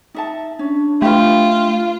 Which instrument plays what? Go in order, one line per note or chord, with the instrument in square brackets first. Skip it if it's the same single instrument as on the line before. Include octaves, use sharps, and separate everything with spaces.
[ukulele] D#4 E5 A5
[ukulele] C#4 [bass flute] D4
[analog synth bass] A3 [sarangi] F4 [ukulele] G4 B4